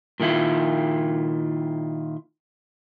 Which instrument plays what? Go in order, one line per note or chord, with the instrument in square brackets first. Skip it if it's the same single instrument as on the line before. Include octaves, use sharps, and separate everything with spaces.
[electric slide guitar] A#2 D#3 G#3 E4 F4